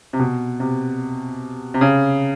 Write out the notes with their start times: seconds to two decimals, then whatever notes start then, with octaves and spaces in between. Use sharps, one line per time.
0.13 C3
0.19 B2
0.60 C3
1.74 C3
1.81 C#3